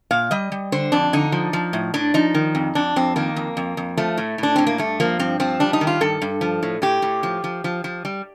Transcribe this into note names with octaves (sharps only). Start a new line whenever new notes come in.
A#2 F5
G3 D#5
G3
D3 C5
F2 D4
D3 D#4
F3
F3
A2
A2 D4
F3 D#4
D#3
F2
F2 D4
F2 C4
D#3 A#3
F2
F2
F2
F3 A3
A2
A2 D4
A2 C4
A#3
G2 A3
F3 A#3
G2 C4
F3 C4
G3 D4
D#4
D#3
F4
G2 A4
G2
F3
A2
A2 G4
A2
F3
F3
F3
F3
G3